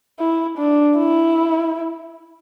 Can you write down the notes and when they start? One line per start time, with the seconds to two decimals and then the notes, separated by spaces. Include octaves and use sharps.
0.19 E4
0.58 D4
0.97 E4